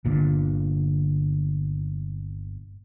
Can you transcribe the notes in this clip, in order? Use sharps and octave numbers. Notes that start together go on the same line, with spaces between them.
G1 A#2 D3